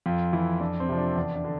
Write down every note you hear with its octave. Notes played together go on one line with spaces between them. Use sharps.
F2 F4
E3 E4
F2 D4
C4
C3 F3
D4
E2 D4
D4
D3